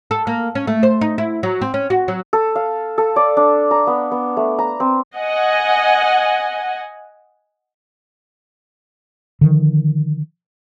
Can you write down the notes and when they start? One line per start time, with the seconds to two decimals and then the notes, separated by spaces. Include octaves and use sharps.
0.11 A4
0.27 A#3
0.55 C#4
0.67 A3
0.83 C5
1.01 D#4
1.18 E4
1.43 F#3
1.61 C4
1.74 C#4
1.90 F#4
2.08 F#3
2.33 A4
2.56 F5
2.98 A4
3.16 D5
3.37 D4
3.71 A#5
3.87 B3
4.11 B3
4.37 A3
4.59 A#5
4.80 C4
5.17 D#5 F#5 G#5
9.41 D3 D#3 F3